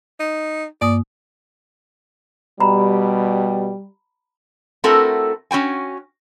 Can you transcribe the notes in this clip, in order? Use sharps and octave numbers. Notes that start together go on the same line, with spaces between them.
D#4
G2 A#3 D5 D#6
B2 G3 A#5 B5
A3 C4 E4 F#4 A4 A#4
C#4 F#4 G5 G#5